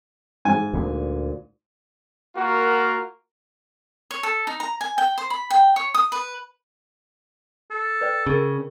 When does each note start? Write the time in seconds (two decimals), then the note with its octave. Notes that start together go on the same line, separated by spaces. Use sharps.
0.45 G#2 G#5
0.73 D2 A#2
2.36 A#3 F4 F#4 A#4
4.11 C#5
4.23 A4
4.47 D#4
4.60 A#5
4.81 G#5
4.98 G5
5.18 C5
5.30 B5
5.50 G5
5.76 C#5
5.94 D#6
6.12 B4
7.71 A4
8.01 B4 D5 G5
8.27 C#3 G#4 A#4